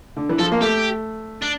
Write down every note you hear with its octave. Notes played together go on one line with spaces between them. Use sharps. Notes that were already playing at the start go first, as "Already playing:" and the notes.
D3
E3
F3 A4
A#3
A3 G4
D4